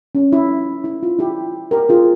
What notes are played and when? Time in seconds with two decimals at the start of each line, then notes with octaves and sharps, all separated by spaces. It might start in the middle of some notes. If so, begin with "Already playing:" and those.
0.15 C#4
0.32 E4
0.84 E4
1.03 F4
1.19 E4 G4
1.71 G4 A#4
1.89 F4 G#4